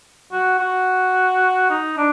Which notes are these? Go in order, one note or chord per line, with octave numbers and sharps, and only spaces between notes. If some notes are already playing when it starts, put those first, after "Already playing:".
F#4
F#4
D#4
D4